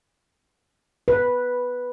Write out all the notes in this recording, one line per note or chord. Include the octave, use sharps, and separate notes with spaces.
B4